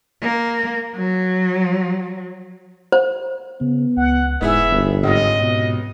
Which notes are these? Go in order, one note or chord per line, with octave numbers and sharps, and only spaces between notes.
A#3
F#3
C5
C#3 B3
C#2 F#5
E1 G#2 B3 E4 G#4 E5
G1
C#2 G#2 C3 F4 D#5
B2